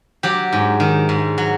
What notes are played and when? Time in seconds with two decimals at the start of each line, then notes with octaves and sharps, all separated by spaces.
0.23 F#3 G4
0.53 G#2
0.80 D#3
1.09 G#2
1.38 F#3